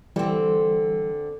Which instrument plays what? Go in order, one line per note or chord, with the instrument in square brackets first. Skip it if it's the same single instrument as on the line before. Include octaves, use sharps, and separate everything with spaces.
[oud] D3 C4 [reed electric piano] E3 G3